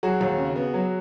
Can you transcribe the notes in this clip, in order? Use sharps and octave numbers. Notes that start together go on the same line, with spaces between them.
F#3 F#4 G#4
D#2
C#3
B3
F#3